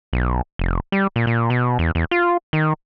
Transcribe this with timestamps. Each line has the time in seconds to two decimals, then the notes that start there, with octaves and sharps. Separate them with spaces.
0.13 B1
0.59 F1
0.92 G3
1.16 A#2
1.27 A#2
1.50 B2
1.79 E2
1.95 E2
2.11 F4
2.53 D#3